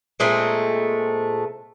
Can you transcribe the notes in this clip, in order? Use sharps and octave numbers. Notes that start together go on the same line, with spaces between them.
A#2 G#3 A3 C4